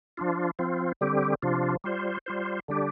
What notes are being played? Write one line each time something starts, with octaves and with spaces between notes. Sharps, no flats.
F3 D4 F4
F3 C4 F4
D3 G3 C4 G4
C3 F3 D4 F4
G3 F4 C5
G3 F4 C5
D3 G3 D4 G4